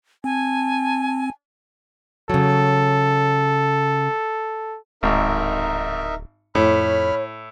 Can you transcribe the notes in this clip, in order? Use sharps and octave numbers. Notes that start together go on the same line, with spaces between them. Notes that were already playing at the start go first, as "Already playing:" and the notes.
C4 G#5 A5
C#3 F#3 A4
D1 G#1 D#4 A#4 E5
F2 A2 C#5 B5 F6